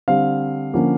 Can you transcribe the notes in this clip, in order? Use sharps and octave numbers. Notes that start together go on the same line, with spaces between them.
D3 G3 C4 F5
D3 F3 A#3 C#4